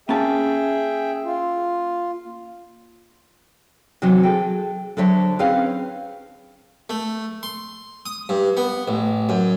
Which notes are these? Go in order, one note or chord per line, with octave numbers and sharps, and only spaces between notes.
A#3 C#4 G#4 E5 G5 A5
F4
C3 E3 F#3 B3 D#4
G#4 A4 G5
D3 F#3 C5 C#5 E5 A5
C4 C#4 D#4 G#4 B4 F5
A3
C6
D#6
G2
B3
A1
F#2